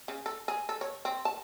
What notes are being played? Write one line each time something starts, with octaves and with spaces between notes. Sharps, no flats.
C#3
A4
G#4
A4
C#5
C4
A5